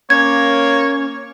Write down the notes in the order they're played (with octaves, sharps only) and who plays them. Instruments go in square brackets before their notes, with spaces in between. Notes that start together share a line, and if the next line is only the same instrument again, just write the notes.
[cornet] A#3 [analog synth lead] C#4 [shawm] C#5 [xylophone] G#6